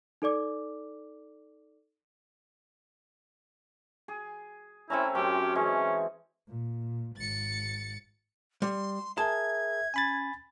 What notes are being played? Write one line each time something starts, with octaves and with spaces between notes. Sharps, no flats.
D#4 A4 D5 D6
G#4
A3 C4 C#4 E4 A#5 C6
F#2 C4 C#4 G4
E3 G#3 C#4
A#2
G#1 A6 C#7
G3 C6
G#4 A#4 E5 A5 G#6
C#4 G#5 B5 A6